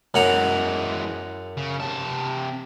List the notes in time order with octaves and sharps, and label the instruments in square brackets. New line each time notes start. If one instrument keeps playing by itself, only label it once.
[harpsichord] F#2 F#5 A#5 [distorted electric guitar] E3 G#3
[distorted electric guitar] C#3
C3 A5